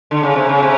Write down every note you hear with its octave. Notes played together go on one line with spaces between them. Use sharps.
D3
C#3
C3
C#3
C3